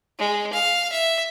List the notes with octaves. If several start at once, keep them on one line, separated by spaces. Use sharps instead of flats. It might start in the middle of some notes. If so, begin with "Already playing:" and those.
G#3
F5
E5